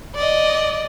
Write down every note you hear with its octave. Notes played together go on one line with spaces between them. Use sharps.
D5 D#5